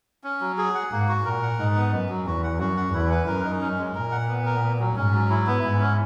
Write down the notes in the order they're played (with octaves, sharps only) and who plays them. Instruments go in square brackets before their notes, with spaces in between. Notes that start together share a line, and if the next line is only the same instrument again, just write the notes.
[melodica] C#4
F#3
G#4
F#5
[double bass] G#2 [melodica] A#3
[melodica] F#4
[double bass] A#2 [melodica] A#4
[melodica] F#5
[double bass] G#2 [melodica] D#4
[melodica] B3
[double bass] F#2 [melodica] B3
[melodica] F#3
[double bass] E2 [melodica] F#4
[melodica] F#5
[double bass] F#2 [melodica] F#4
[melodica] F#5
[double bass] E2 [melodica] E4
[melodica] B4
[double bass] F#2 [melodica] A#4
[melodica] D#4
C#4
G#3
[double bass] A#2 [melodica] A#4
[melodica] F#5
B3
A#4
B3
F#3
[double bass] G#2 [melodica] C#4
[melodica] F#3
E4
B3
[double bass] G#2 [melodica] E4
[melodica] C#4